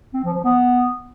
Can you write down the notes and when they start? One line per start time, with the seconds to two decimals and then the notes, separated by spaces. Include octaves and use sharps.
0.14 C4
0.24 F3
0.34 F3
0.44 B3